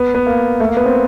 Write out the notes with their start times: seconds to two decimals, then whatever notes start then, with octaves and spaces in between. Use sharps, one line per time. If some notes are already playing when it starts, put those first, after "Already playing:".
Already playing: B3
0.15 B3
0.27 A#3
0.60 A3
0.69 A#3
0.77 B3
0.86 C4